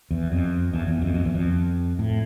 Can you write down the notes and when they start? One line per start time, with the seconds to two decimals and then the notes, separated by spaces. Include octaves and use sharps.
0.11 E2
0.32 F2
0.73 E2
0.87 E2
1.02 F2
1.14 F2
1.25 E2
1.35 F2
1.99 A2